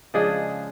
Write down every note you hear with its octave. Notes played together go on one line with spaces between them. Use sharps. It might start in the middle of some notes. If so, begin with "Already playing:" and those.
C#3 F3 G#3 D4 G#4